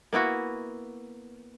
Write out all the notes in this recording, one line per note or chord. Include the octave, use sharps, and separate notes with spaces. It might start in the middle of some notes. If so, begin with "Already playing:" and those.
A#3 B3 E4 F#4